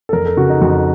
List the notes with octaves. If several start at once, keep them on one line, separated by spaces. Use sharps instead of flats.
A4
F2 A#4
A4
C#3 F#4
D#4
F2 F#4